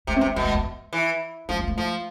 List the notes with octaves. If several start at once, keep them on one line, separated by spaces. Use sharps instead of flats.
C3 A3
C4
C3
B3
B2 G3
A3
B3
E3
F3 A3
G3
A3
F3